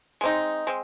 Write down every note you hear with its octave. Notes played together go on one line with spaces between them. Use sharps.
G#3 C4 D#4
G#3 C4